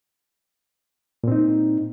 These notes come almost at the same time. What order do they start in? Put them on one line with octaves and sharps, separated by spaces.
A#2 C4 D#4